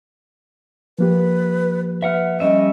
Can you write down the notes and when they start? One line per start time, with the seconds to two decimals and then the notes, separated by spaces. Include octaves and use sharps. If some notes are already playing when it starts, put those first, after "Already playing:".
0.99 F3 A#3 G4 B4
2.03 B4 E5 F#5 F6
2.40 G3 C#4 D#5 E5